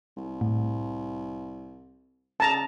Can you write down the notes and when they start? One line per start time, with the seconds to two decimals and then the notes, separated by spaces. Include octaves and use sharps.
0.17 C2
0.41 A2
2.40 C#3 A5 A#5